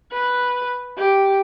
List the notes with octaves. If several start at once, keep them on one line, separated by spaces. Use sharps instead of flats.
B4
G4